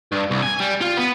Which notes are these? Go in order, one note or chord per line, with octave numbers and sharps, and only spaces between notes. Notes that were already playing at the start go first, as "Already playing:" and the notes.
G2
C2
G#5
G3
F4
B3